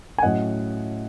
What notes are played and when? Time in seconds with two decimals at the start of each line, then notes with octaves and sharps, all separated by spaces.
0.18 G#5
0.22 A2 F#3 C#4 D#5 F#5